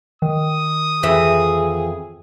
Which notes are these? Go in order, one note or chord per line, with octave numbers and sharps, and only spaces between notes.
D#3 D#6
F2 E3 G#4 E5